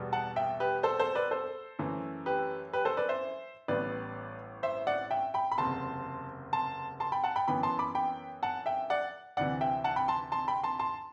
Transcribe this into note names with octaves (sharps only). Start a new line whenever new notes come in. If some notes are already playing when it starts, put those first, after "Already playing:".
Already playing: E2 B2 G3 B3
F#5 A5
E5 G5
G4 B4
A4 C5
A4 C5
B4 D5
A4 C5
F#2 E3 A3
G4 B4
G4 B4
A4 C5
B4 D5
C5 E5
A1 A2 G3 B3 B4 D5
C5 E5
D5 F#5
E5 G5
G5 B5
B5
F#1 E2 C3 A5 C6
A5 C6
A5 C6
G5 B5
F#5 A5
G5 B5
F#2 E3 B3 G5 B5
A5 C6
B5 D6
G5 B5
F#5 A5
E5 G5
D5 F#5
D2 C3 E3 D5 F#5
E5 G5
F#5 A5
G5 B5
A5 C6
A5 C6
G5 B5
A5 C6
A5 C6